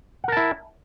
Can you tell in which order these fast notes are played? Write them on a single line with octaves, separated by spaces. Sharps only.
F#5 A#4 A5 E4